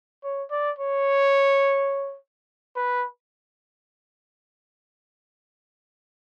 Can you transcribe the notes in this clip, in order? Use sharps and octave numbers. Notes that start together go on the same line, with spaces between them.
C#5
D5
C#5
B4